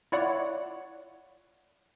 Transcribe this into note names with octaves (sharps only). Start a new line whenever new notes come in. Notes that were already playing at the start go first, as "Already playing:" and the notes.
E4 F4 C#5 D5 F#5